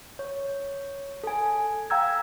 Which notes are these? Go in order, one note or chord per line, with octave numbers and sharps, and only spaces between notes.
C#5
A4 G#5
F5 G5 A#5 E6 G#6